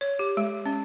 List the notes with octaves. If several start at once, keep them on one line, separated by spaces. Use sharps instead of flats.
C#5
G4
G#3
C#4